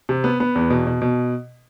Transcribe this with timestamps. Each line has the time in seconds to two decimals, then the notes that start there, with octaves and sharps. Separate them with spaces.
0.09 C3
0.24 B3
0.40 B3
0.55 E2
0.70 B2
0.87 B2
1.02 B2